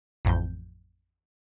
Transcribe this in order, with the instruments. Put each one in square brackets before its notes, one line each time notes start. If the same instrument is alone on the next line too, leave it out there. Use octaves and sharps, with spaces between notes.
[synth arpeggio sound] A1 F2 G6